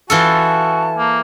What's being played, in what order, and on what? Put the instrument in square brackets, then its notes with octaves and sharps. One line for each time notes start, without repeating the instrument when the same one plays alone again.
[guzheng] E3 F4 A4 [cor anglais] F#4 [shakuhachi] A5
[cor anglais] A#3